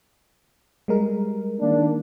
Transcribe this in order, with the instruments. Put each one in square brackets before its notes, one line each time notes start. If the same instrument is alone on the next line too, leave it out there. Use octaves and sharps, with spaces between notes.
[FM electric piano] G3 G#3 A#4
[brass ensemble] D#3 A#3 D4